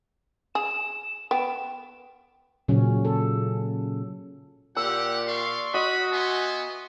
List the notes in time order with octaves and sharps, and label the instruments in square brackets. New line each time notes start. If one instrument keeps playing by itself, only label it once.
[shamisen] G#4 [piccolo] E7
[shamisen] B3 [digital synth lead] G5
[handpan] A#2 C#3 F#3 C#4
A4
[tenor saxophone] A#2 [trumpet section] G4 [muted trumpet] F#5 [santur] E6
[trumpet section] D5 C6 C#6 [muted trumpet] F5
[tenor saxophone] F#4 [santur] D#5 [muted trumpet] B5
[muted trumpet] B3 [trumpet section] E5 G#5 C6